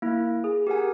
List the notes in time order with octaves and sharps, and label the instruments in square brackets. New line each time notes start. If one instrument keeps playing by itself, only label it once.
[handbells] A#3 E4
G#4
G4 A#4 F#5 G#5